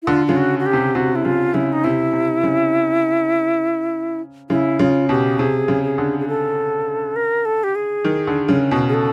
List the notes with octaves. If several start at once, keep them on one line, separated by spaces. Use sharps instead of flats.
E4
D3 F4
C#3 F4
F#4
F#4
G4
C3
C3 F#4
E4
C#3 F4
C#3 E4
D#4
C3 E4
C3
C#3
C#3 E4
C#3 F4
B2 G4
C3 G#4
C#3
G#4
D3
G#4
A4
A#4
A4
G4
G#4
D#3
D3
C#3
B2
G#4
A4